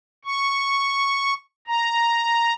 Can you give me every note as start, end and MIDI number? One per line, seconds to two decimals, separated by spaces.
0.25 1.34 85
1.67 2.54 82